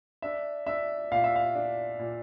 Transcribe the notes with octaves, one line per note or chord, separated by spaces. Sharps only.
D4 E5
D4 E5
A#2 F5
E5
F5
D4
A#2